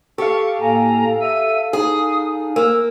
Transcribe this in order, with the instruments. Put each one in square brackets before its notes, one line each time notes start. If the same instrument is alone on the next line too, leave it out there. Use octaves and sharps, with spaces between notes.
[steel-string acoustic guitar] G4 [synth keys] A4 F5 [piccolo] C#6
[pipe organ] A2 A#3 G#5 [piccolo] A#5
[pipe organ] E5 E6 [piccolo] D#7
[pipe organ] D#4 [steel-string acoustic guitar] G#4 [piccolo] D#6
[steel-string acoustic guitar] A#3 [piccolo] E6